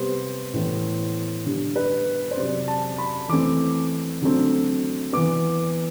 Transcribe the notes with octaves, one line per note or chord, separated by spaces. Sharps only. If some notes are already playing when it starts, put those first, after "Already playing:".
Already playing: C3 G3 B3 C5
A2 E3 B3
D3 G3 B3
B4
C5
C3 F#3 C4 D5
A5
B5
E3 A3 C4 D6
D3 F#3 A3 C4
E3 B3 D6